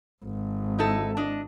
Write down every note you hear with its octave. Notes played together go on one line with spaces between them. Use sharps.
G#1
D#4 E4 A4
D4 D#5